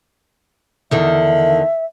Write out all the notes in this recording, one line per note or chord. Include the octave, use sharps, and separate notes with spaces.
E2 D3 D#3 E5